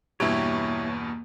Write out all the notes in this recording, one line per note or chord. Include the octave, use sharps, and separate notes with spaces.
E2 G2 B2 A#3 E4 G4 C#5